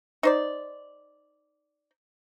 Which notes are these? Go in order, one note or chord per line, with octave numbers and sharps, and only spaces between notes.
D#4 C5 D5